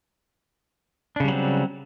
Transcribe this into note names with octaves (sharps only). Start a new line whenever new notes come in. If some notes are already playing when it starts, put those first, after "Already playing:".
C#3 F#3 G3 C4 D4